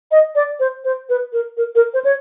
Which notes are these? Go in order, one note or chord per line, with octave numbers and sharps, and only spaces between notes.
D#5
D5
C5
C5
B4
A#4
A#4
A#4
C5
C#5